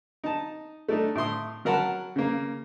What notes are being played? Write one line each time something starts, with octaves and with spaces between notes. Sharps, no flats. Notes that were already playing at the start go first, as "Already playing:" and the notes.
D#4 A5
A3 D4 D#4
A2 E4 C6 D#6
F#3 A#4 F#5 A5 B5
C#3 A#3